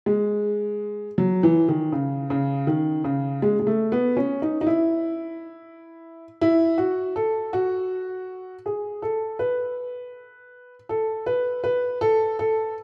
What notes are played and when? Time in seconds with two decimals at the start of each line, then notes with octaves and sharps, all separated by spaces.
0.06 G#3
1.18 F#3
1.43 E3
1.68 D#3
1.92 C#3
2.30 C#3
2.67 D#3
3.04 C#3
3.42 G#3
3.59 G#3
3.67 A3
3.92 B3
4.17 C#4
4.42 D#4
4.61 D#4
4.67 E4
6.41 E4
6.78 F#4
7.16 A4
7.53 F#4
8.66 G#4
9.02 A4
9.39 B4
10.89 A4
11.26 B4
11.64 B4
12.01 A4
12.39 A4